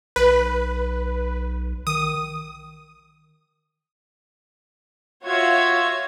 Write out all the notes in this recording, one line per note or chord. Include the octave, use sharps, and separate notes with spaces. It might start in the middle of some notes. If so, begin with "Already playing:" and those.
B1 B4
D#3 D#6
F4 F#4 C#5 E5 G#6